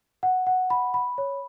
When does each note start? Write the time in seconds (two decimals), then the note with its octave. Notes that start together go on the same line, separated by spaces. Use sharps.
0.23 F#5
0.47 F#5
0.70 B5
0.94 B5
1.18 C#5